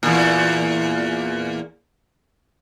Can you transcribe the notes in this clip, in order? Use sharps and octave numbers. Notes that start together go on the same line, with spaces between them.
E2 A#2